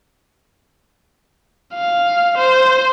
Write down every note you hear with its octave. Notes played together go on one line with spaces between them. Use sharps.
F5
C5